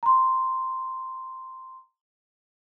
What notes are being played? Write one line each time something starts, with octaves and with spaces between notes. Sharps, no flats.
A#5 C6